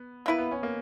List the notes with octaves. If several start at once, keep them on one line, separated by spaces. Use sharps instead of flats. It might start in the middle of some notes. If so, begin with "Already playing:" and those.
Already playing: B3
A#3 B3 E4 B4
B3
C#4
A#3